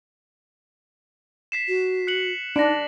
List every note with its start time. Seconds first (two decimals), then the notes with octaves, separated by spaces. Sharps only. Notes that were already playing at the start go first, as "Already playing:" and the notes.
1.52 B6 C7 E7
1.68 F#4
2.07 F#6 C#7 F#7
2.56 D4 D#4 A#6 D7